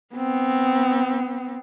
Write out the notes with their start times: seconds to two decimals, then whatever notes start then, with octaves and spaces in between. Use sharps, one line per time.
0.15 B3 C4